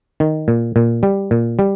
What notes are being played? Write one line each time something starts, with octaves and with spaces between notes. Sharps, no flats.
D#3
A#2
A#2
G3
A#2
G3